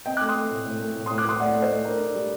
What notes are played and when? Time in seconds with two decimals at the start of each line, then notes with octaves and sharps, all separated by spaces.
0.06 C4 D#5 G5
0.17 A3 D6 F#6
0.29 C6 D#6
0.35 A3
0.50 A2
0.66 A2
0.80 A3
0.96 A2
1.06 A2 C6 D#6
1.18 D6 F#6
1.25 A2 C6 D#6
1.40 A2 D5 F#5
1.55 A3
1.62 C5 D#5
1.71 A3
1.84 D4 A#4 D5
2.00 D4
2.15 G3